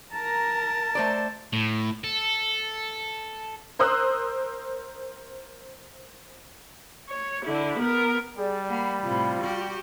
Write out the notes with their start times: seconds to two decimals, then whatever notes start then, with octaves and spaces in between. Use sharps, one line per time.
0.13 A#4 A5 A#5
0.95 A3 C5 D5
1.53 A2
2.04 A4
3.79 A#4 C5 C6 D#6 E6 F#6
7.09 C#5
7.44 D3 E4
7.78 B3 A#4
8.38 G3 G#4 D5
8.70 A#3 F#5 B5
9.03 A2 C3 F4
9.41 F#4 G4